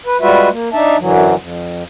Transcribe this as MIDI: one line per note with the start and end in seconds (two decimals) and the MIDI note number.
0.06 0.17 71
0.21 0.49 55
0.21 0.49 56
0.21 0.49 65
0.21 0.49 66
0.21 0.49 71
0.21 0.49 76
0.50 0.69 58
0.73 0.97 62
0.73 0.97 63
0.73 0.97 76
0.73 0.97 81
0.99 1.35 42
0.99 1.35 50
0.99 1.35 52
0.99 1.35 54
1.38 1.83 41